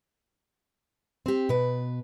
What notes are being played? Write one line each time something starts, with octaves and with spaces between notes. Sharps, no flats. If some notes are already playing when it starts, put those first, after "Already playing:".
C4 G4
B2 B4